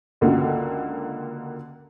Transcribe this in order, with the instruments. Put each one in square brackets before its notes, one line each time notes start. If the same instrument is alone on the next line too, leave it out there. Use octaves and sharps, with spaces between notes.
[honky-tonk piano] C#2 D3 A#3 F4 F#4